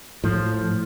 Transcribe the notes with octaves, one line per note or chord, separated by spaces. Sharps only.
A2 F3